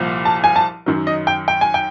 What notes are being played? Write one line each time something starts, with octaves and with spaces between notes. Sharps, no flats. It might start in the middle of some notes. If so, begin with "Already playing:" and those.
Already playing: C2 A#2 F3
A5
G#5
A5
F#2 D#3 F#3
D#5
G5
G5
G#5
G5